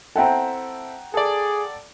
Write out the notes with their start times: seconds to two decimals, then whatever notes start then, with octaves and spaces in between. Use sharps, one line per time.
0.16 C4 E4 A4 F#5 G5 A#5
1.14 G#4 A4 D5